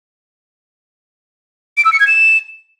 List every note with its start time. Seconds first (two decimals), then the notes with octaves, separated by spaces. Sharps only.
1.77 D7
1.85 E6
1.92 C#7
2.00 G#6
2.07 E7